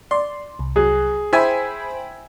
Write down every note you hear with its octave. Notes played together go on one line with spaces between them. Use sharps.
D5 C6
C2
F#3 G#4
E4 C5 G5 G#5 B5